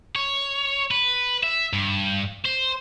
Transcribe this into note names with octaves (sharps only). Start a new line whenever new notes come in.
C#5
B4
E5
G2
C5